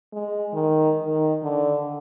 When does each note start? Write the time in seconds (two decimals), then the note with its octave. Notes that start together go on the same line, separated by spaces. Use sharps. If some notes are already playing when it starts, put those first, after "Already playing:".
0.13 G#3
0.54 D#3
1.02 D#3
1.43 D3